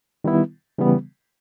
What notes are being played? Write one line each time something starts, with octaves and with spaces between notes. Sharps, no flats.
D#3 G3 B3 E4
C#3 E3 G3 B3